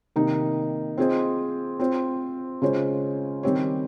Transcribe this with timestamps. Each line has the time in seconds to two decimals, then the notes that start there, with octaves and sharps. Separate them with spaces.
0.16 C3 D#3 A#3 D#4
0.98 C4 F4 G#4 C5 D#5
1.79 C4 F4 C5
2.62 C#3 G#3 C#4 F4 C5
3.43 D#3 G3 C4 G4 C#5